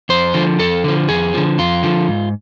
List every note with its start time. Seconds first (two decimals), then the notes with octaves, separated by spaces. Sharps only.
0.09 F2 C5
0.34 D3 F3
0.59 F2 A4
0.84 D3 F3
1.09 F2 G#4
1.34 D3 F3
1.58 F2 F4
1.83 D3 F3
2.08 G#2